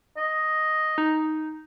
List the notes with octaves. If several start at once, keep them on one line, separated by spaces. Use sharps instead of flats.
D#5
D#4